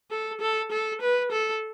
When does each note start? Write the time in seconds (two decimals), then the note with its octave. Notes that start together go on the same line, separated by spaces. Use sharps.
0.11 A4
0.41 A4
0.71 A4
1.01 B4
1.31 A4